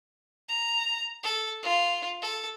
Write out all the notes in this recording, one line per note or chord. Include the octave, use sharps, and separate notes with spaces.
A#5
A4
F4
A4